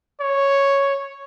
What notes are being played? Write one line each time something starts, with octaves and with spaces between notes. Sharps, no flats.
C#5